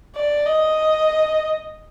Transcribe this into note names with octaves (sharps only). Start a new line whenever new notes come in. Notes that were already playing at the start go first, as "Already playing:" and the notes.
D5
D#5